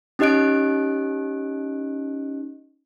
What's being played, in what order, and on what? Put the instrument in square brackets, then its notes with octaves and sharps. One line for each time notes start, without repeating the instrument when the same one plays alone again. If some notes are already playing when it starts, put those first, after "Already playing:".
[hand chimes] C#4 D#4 G4 D#5 F#6 D7